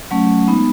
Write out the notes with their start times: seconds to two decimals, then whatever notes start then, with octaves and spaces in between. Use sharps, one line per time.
0.11 F#3 A3 C#4
0.48 G#3 B3 D#4